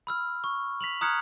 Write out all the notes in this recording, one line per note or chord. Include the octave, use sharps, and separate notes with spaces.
B5 E6 F6
C#6
B6 F7 F#7
A#5 D#6 F6 F#6 G#6 C#7